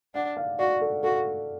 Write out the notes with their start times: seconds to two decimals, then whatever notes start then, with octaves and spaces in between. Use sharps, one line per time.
0.14 D4 F#5
0.37 F5
0.59 F#4 D5
0.81 A4
1.03 F#4 A4